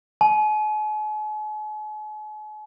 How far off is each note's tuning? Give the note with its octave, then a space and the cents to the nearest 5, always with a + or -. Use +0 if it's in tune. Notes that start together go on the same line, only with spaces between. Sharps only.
G#5 +45